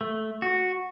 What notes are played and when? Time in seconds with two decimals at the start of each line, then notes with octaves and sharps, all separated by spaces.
0.01 A3
0.42 F#4